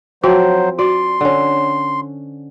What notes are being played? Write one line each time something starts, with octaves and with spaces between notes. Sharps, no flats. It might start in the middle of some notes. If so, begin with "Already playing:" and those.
F3 F#3 C4 F#4 C5
F#4 D5 C6
D3 C#4